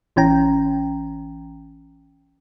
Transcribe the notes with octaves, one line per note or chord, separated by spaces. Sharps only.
A1 E3 C#4 G5 A#5